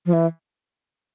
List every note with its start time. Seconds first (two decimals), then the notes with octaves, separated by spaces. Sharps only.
0.06 F3
0.13 E3